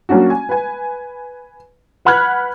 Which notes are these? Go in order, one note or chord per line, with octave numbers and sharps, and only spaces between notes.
F#3 A#3 C#4 D4 F#4
G#5
B4 G#5
B4 F#5 B5 F6 F#6 G#6